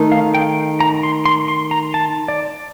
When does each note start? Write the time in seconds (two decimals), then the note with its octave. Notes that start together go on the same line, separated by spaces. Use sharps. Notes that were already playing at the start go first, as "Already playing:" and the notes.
Already playing: D#3 A3 D#4 A4
0.12 F5
0.34 G5
0.80 A#5
1.03 C6
1.25 C6
1.48 C6
1.71 A#5
1.94 A5
2.28 D5